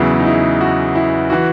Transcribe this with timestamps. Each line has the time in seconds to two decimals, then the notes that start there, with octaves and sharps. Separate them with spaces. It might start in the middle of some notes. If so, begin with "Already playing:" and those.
Already playing: E2 C#3 F#3 E4
0.19 D#4
0.26 E4
0.61 F#4
0.95 E4
1.30 E3 F#4